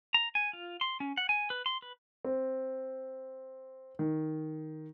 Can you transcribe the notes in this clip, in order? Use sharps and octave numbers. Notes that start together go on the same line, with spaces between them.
A#5
G#5
F4
C6
C#4
F#5
G#5
B4
C6
B4
C4
D#3